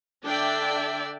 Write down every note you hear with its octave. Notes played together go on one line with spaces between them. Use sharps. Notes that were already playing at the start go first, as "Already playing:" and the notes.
D3 D4 D5 E5 G5